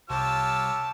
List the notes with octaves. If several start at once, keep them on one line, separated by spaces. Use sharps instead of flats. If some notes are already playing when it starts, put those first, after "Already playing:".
C2 F4 G4 C#5 A5 E6